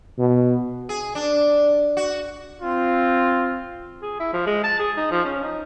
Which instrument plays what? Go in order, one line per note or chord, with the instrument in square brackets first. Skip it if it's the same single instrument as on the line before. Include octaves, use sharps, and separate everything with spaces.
[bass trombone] B2
[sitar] G#4
D4
F#4
[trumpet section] C4 F4
[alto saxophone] G#4
E4
F3
G#3
A5
G#4
D#4
F3
C#4
D#4